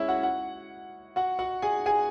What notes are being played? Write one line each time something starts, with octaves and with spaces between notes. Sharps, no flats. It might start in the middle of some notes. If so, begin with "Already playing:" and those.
Already playing: G#3 C#4 E4 C#5 E5
F#4 F#5
F#4 F#5
F#4 F#5
F#4 F#5
G#4 G#5
G#4 G#5